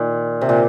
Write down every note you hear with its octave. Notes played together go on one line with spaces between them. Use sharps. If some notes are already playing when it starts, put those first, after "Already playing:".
Already playing: A#2 D#3
C3
A#2